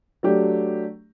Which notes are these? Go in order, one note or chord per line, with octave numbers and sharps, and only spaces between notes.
F#3 A3 D4 G4